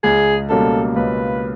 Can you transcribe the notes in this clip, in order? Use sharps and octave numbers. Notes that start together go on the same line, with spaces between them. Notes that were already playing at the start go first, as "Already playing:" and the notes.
C#2 G#4
B2 G3 A#3 C#4 A4
C#2 B4